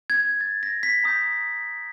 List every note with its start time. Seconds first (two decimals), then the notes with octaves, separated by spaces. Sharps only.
0.10 G#6
0.41 A6
0.63 A#6
0.83 B6
1.04 A#5 D#6 G6